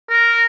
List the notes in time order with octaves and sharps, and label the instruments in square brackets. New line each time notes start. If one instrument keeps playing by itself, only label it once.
[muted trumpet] A#4